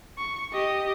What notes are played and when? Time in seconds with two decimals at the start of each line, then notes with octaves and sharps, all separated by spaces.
0.18 C#6
0.53 G4 D#5